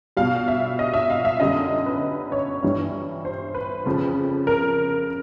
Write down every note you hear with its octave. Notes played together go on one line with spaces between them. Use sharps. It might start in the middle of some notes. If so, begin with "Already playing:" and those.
B2 G3 F5
E5
D#5
E5
F5
E5
F#2 D3 G3 D#5
B4
C#5
G2 E3 G3
C5
B4
F2 C#3 F3
A#4